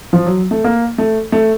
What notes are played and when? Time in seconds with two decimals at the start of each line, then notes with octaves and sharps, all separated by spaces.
0.13 F3
0.26 F#3
0.51 A3
0.64 A#3
0.98 A3
1.32 A3